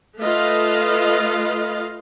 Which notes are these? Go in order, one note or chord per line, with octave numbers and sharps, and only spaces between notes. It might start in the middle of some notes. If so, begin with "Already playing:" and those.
A3 F4 B4 D#5 F5